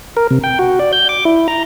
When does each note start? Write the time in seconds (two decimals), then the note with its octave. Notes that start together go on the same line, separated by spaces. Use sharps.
0.17 A#4
0.31 C3
0.44 G5
0.59 F#4
0.79 D5
0.93 G6
1.09 D6
1.25 E4
1.48 A#5